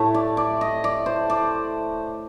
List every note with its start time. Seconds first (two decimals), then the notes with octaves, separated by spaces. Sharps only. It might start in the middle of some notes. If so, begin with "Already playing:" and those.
Already playing: A2 A3
0.14 D5
0.37 D5
0.61 D#5
0.84 D5
1.06 C5
1.30 D5